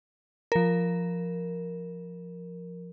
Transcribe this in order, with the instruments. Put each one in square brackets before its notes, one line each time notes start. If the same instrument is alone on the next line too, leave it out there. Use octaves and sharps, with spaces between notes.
[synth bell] F3 A#4